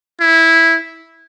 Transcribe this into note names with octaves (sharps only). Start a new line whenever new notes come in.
E4